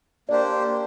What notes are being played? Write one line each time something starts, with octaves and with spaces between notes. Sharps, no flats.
A#3 D4 G4 C5 D5